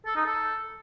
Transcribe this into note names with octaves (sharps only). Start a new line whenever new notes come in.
A4
D#4
A4